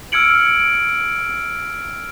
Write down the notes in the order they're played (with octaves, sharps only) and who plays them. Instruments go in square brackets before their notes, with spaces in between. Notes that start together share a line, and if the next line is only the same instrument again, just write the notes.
[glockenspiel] E6 F6 G#6 C#7 D7 F#7